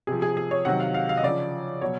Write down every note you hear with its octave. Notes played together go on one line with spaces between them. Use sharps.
C3 F3 G#4
G#4
G#4
C#5
C3 D#3 F#3 F#5
F5
F5
F5
D#5
C#3 F3 D5
B2 F#3 C#5